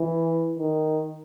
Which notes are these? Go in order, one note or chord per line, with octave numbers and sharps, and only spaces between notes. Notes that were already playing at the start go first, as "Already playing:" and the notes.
Already playing: E3
D#3